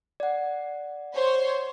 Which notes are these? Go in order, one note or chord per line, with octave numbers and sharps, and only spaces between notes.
D5 F#5
C5 C#5 C6